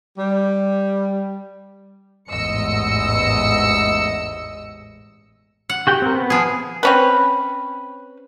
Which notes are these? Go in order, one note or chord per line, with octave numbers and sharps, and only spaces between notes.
G3
A1 E2 G#2 D#5 E6 C#7
F#5
F#4 G4 G5
C4 A#4
B3
F3 G#4
C4 C#4 B4